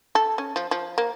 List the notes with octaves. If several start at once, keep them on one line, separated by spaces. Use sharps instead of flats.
A4
C#4
F3
F3
A#3